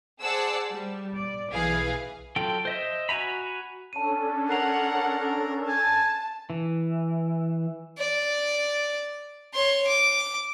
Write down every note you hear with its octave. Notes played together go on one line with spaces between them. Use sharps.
G#4 C5 D5 F#5 A5 E6
G3
D5
B1 E3 G#4 B4 F5
F#3 F4 A4 G5
C5 D#5 E5
F#4 G#5 A#5 B5
C#4 D4 A4 A5 D#7
A#4 F#5 F#6 C7 F7
G#5 A5
E3
D5
C#5 C6
D6